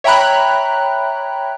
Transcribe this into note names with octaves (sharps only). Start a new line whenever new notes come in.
C#5 E5 G5 A#5 B5 F#6